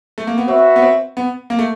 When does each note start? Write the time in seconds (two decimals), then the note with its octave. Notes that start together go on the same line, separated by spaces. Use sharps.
0.18 A3
0.27 A#3
0.38 B3
0.48 C4 F#4 B4 E5
0.76 B3
0.82 C4
1.17 B3
1.50 A#3
1.59 A3